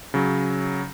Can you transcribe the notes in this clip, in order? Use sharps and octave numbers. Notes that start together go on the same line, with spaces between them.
C#3 F#3